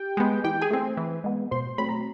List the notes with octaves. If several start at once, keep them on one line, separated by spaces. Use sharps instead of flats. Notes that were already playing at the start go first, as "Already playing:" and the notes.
Already playing: G4 G5
G#3 B3
E3 G4 G5
G#4 G#5
A3 C4
E3
G#3 B3
B2 C5 C6
F#3 A3 C4 B5
A#5